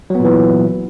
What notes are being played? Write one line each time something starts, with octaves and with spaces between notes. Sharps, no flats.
A#2 E3 F#3 B3